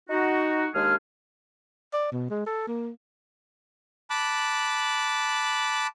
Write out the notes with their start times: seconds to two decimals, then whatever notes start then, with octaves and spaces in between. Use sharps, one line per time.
0.09 D#4 F#4
0.74 D#2 G#3 D4 G#4 F6
1.93 D5
2.12 B2
2.30 G#3
2.46 A4
2.68 A#3
4.10 A5 B5 D6 F#6